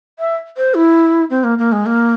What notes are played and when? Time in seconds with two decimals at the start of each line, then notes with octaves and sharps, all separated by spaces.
0.19 E5
0.57 C5
0.75 E4
1.30 C4
1.44 A#3
1.59 A#3
1.72 G#3
1.86 A#3